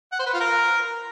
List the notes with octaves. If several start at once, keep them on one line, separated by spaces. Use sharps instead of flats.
F#5
C5
B4
F4
A#4